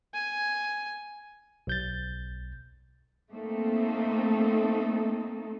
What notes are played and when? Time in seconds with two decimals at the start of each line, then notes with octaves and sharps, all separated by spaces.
0.14 G#5
1.67 B1 G6 A6
3.31 A3 A#3 C4 D#4 A4